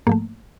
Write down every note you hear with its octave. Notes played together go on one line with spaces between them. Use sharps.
G#2 F3 A3 A#3